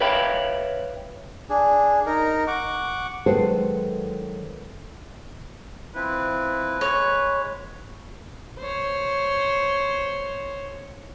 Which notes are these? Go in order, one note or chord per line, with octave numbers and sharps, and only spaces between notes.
B4 C#5 E5 F5 G5 B5
D4 G#4
D#4 A#4
F#5 C#6 D6
D#3 F#3 G#3 A4 B4 C5
F3 C4 E4 B4
G#3 C#5
C5 C#5